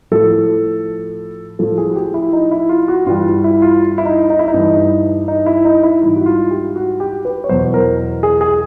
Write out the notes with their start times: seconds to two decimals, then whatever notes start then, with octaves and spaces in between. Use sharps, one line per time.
0.11 A2 F3 A4
1.59 A2 F3 A4
1.78 G#4
1.90 F#4
1.96 G4
2.14 E4
2.33 D#4
2.51 E4
2.69 F4
2.88 F#4
3.06 G2 E3 G3 F4
3.44 E4
3.62 F4
3.98 E4
4.05 D#4
4.30 D#4
4.39 E4
4.48 D#4
4.54 G2 E3 G3
5.28 D#4
5.46 E4
5.65 D#4
5.83 E4
6.02 G#2 E3 G3 E4
6.16 F#4
6.26 F4
6.51 G4
6.76 F#4
7.00 G4
7.25 B4
7.44 C#5
7.49 E2 B2 F#3 C5
7.74 A#4
8.23 G#4
8.41 G#4